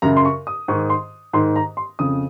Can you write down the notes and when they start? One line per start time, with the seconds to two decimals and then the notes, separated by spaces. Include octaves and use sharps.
0.02 F#2 C#3 A#5
0.17 C6
0.25 C#6
0.47 D#6
0.68 G#2 C#6
0.71 D#3
0.90 C6
1.33 G#2 D#3 C6
1.56 A#5
1.77 C6
1.99 F2 C#3 D#6